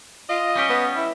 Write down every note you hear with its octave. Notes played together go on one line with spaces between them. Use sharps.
F4 D#5
G3 C#4 G4
B3
E4